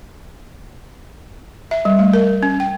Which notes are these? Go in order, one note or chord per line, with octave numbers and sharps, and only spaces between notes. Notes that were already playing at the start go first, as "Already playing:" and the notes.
E5
G3
A3
A#4
C#4
G5